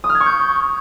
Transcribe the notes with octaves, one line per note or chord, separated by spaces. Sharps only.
D#6
F6
G#6
C#6
G6